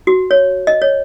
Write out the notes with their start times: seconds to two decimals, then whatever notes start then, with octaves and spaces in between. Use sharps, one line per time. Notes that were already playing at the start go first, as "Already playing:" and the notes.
0.07 F#4
0.31 C#5
0.67 D#5
0.82 C#5